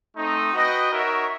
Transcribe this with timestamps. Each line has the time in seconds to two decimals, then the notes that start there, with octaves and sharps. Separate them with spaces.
0.16 A3 C4 D#4
0.53 F#4 B4 D#5 G5
0.90 D#4 F#4 A#4 C#5 E5